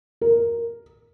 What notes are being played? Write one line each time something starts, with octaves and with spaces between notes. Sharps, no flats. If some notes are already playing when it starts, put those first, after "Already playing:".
A#4